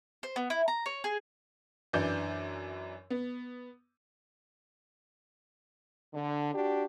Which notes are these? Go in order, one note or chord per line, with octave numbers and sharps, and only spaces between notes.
C5
B3
E4
A#5
C#5
G#4
F#2 E3 D4 D5 G6
B3
D3
D4 F#4 G4